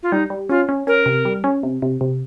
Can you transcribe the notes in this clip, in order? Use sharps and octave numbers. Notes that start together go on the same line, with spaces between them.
F4
G3 D#4
G3
C#4 F4
C#4
C#4 A#4
C3
G3
C#4
C3
C3
C3